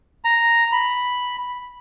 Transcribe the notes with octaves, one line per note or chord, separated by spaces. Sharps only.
A#5
B5